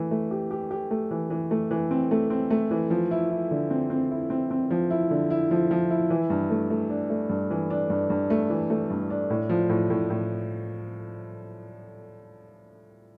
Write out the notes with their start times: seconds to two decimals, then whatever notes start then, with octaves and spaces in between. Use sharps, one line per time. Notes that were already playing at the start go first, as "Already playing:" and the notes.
Already playing: E3 A3
0.11 A3
0.31 G4
0.51 G4
0.71 G4
0.91 A3
1.11 E3
1.30 E3
1.51 A3
1.71 E3
1.91 C4
2.11 A3
2.30 C4
2.51 A3
2.71 E3
2.90 F3
3.11 E4
3.30 E4
3.51 D3
3.70 C4
3.90 C4
4.11 E4
4.30 C4
4.51 C4
4.70 F3
4.90 E4
5.11 D3
5.30 E4
5.51 F3
5.71 F3
5.91 E4
6.10 E3
6.30 G2
6.50 A3
6.70 A3
6.89 D4
7.10 A3
7.29 G2
7.51 E3
7.70 D4
7.90 G2
8.10 G2
8.30 A3
8.50 E3
8.70 A3
8.90 G2
9.10 D4
9.30 A2
9.49 F3
9.69 A2
9.90 A2
10.10 A2